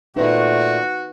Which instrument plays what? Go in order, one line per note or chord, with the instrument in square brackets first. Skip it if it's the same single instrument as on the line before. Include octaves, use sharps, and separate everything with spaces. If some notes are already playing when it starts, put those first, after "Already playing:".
[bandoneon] A#2 A3 [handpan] D#4 B4 C5 [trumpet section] F#4